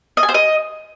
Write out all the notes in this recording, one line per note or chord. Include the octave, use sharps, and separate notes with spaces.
D#5
G#5
C5
D#5